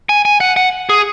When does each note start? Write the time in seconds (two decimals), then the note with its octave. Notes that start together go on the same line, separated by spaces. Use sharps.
0.09 G#5
0.25 G#5
0.40 F#5
0.56 F#5
0.89 G#4